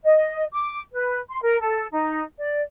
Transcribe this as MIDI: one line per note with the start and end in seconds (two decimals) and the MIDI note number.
0.04 0.45 75
0.52 0.80 86
0.92 1.18 71
1.28 1.39 84
1.42 1.59 70
1.60 1.85 69
1.90 2.21 63
2.38 2.60 74